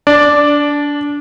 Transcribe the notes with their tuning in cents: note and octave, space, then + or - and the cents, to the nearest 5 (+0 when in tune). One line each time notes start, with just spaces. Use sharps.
D4 -20 D5 +0